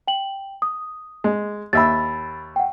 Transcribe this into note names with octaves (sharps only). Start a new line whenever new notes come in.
G5 F#7
D#6
G#3
D#2 E5 B5 E6 A6
F#5 G5